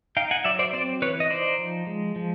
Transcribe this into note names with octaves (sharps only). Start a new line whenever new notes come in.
D#4 F5 G5
F#5 G#5
F#3 D5 E5
C5 D5
C4 C5 D5
E3 B4 C#5
D#5
D#4 C5 D5
F3
G#3
F3